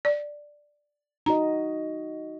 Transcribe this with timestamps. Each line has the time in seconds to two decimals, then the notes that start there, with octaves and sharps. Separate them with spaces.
0.05 D5
1.26 D#4 F#4 D#5 A#5